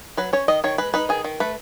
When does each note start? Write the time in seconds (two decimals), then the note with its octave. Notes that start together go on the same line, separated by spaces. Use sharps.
0.17 F#3 B4
0.33 C#4 C#5
0.48 D#3 D#5
0.64 D#3 C#5
0.78 G#3 B4
0.94 D#4 B4
1.09 D#3 G#4
1.24 D#3
1.40 A3 B4